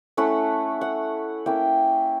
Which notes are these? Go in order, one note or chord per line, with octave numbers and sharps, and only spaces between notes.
A3 C#4 E4 F#5
F#5
A#3 C#4 E4 G5